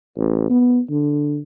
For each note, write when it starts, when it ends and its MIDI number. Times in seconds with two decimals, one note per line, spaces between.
0.17 0.48 33
0.50 0.80 59
0.90 1.39 50